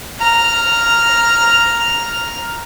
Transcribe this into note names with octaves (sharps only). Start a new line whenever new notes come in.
A#5 F6